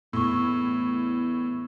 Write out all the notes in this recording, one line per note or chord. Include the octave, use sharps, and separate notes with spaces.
E2 A2 C#6 E6